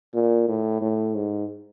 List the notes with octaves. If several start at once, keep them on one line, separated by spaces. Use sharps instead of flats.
A#2
A2
A2
G#2